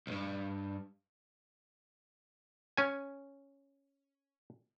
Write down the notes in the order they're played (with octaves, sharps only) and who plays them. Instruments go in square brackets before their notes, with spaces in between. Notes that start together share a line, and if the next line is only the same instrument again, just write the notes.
[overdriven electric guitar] B1 G2
[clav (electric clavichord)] C#4 G#5